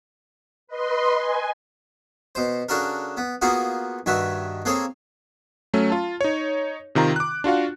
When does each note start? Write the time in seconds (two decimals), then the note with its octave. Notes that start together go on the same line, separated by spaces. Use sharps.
0.67 B4 D#5 C6
1.17 G#5
2.35 B2 C5
2.69 C#3 D4 F#4 A4 A#4
3.17 B3
3.42 A#3 B3 F4 F#4 G#4
4.06 G2 D#3 F#4 E5
4.65 A#3 C4 G#4 A4 C#5
5.73 F#3 A3 C#4
5.90 F4 A5
6.21 D#4 C#5
6.95 C3 D#3 F4 A#5
7.16 D6 F#6
7.44 D4 F4 F#4 F5